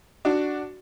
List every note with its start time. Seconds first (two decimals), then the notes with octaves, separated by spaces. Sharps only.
0.25 D4 F#4